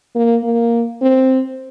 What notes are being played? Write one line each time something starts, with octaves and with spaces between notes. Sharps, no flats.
A#3
A#3
C4